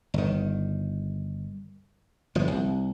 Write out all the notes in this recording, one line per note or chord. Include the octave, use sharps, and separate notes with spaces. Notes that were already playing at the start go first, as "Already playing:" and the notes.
G1 D#3
G1 F3
C2